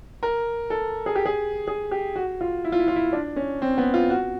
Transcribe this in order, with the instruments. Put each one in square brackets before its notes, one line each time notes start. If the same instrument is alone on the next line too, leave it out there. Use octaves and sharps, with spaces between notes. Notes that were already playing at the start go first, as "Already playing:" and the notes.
[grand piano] A#4
A4
G#4
G4
G#4
G#4
G4
F#4
F4
E4
F4
E4
F4
E4
D4
C#4
C4
B3
F4
F#4